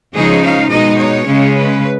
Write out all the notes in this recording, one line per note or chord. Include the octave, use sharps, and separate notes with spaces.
C#3 F3 G#3 D#4 G#4
F5
B2 G#3 D#4 D#5
C#5
C#3 G#3 C#4
B4